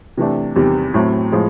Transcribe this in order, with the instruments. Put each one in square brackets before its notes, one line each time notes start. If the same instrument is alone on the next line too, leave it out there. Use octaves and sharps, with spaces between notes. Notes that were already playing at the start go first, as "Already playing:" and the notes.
[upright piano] C3 E3 A3 D4
E2 C3 D#3 G3
A2 F#3 A3 C4
A2 F3 G#3